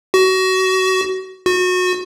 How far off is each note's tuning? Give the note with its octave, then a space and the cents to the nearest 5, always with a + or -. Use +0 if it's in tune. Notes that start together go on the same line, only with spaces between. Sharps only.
F#4 +25
F#4 -25